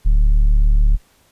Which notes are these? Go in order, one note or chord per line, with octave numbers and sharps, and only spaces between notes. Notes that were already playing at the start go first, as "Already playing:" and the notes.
D1